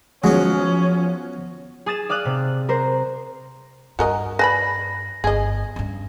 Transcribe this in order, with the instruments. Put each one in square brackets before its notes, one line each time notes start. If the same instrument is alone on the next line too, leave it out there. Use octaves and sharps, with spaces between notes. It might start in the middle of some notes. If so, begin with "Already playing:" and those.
[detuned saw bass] F3 [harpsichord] F#3 B3 [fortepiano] G#3 [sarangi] C#4
[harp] G#4 D#6 A6 E7
D5 F5 D#6 F#6
C3
A#4 C5
[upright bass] G2 [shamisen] F#4 A#4 D#5
[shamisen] B4 D5 B5 [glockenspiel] A#6
[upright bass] G1 [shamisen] G#4 D#5
[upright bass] G2 C#4